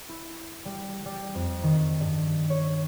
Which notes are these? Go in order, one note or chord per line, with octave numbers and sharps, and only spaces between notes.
E4
G3
G3
F2
D#3
G2
C#5